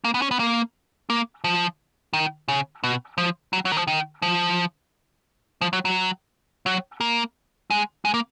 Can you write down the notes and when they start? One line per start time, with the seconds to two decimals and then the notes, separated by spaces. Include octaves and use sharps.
0.05 A#3
0.14 B3
0.22 C#4
0.31 B3
0.40 A#3
1.10 A#3
1.44 F3
2.13 D#3
2.48 C#3
2.84 B2
3.18 F3
3.53 F#3
3.65 F#3
3.72 D#3
3.77 F3
3.87 D#3
4.22 F3
5.61 F3
5.73 F#3
5.85 F#3
6.66 F#3
7.01 A#3
7.70 G#3
8.05 G#3
8.14 A#3